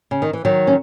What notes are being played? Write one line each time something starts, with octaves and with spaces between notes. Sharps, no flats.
C#3
D#3
E3
D#3 F#3
C#4